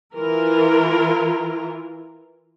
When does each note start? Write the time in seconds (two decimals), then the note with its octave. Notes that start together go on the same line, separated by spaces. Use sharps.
0.16 E3 E4 F4 A#4